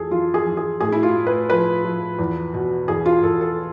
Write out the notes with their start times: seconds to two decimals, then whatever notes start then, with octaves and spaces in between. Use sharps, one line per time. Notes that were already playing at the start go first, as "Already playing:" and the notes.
Already playing: F2 E3 G#4 A4
0.11 E3 F4
0.34 G#4
0.46 E3
0.57 G#4
0.80 A2 G#4
0.92 E4
1.03 F4
1.15 A2
1.27 B4
1.50 F3 B4
1.85 F3
2.19 E2
2.54 B2
2.88 E2 G#4
3.06 F4
3.23 E2 A4
3.41 A4